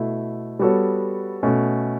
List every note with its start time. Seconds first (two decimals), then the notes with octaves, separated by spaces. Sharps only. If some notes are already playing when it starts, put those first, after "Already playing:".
Already playing: B2 A3 E4
0.59 G3 B3 F#4 A4 C#5
1.43 B2 A3 C#4